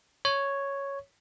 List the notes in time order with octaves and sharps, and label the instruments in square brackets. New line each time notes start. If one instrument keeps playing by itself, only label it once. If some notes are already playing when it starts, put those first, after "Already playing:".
[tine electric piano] C#5